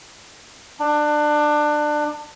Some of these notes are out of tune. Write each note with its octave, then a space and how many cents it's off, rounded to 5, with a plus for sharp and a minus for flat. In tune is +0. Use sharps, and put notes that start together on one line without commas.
D4 +25